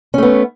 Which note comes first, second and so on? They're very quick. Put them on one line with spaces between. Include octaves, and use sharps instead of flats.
C#4 A3 B3